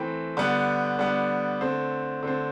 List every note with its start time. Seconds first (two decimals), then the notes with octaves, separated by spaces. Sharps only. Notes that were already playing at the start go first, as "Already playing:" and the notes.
Already playing: E3 A3 C4 G5 B5
0.37 D3 G3 B3 D4
0.99 D3 G3 B3 D4
1.61 D3 A3 C4
2.23 D3 A3 C4